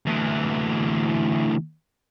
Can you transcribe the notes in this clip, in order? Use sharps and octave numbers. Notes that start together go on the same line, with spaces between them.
D2 E3